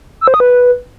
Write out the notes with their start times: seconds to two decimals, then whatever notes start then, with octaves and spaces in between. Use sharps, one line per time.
0.21 E6
0.28 C5
0.34 D#6
0.40 B4